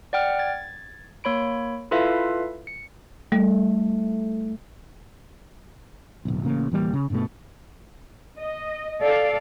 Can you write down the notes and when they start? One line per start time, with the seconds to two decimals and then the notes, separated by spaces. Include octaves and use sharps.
0.13 D5 F#5 G5 F6
0.39 G#6 A6
1.24 A#3 C#5 B5 D7
1.91 E4 F4 A4 B4 E5 F5
2.67 C#7
3.32 G3 A3
6.25 D1 B1
6.43 A1 C#3 A#3
6.71 D1 E3 G3 A#3
6.93 C#3
7.10 G2 B2 A3
8.39 D#5
9.01 A4 D5 F5